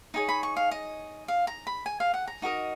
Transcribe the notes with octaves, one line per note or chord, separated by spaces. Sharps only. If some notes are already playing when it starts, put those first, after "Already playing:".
D#4 G#4 C#5
B5
C#6
F5
D#5
F5
A#5
B5
G#5
F5
F#5
A#5
D#4 F#4 A#4 D#5